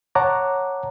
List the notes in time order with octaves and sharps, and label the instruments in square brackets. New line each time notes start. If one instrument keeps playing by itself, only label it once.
[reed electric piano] C#5 F#5 A5 A#5 D6